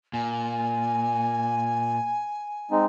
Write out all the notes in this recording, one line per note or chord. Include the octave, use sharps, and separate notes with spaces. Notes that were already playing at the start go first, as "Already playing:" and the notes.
A#2 G#5
G#3 C4 D#4